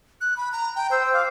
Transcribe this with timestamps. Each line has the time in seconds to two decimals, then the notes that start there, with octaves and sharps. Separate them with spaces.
0.21 F#6
0.37 B5
0.52 A#5
0.75 G5
0.91 C5 E6
1.14 F5 D6